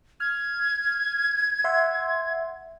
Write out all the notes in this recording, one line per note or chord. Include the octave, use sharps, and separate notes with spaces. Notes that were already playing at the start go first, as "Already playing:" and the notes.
F6 G#6
E5 F#5 C6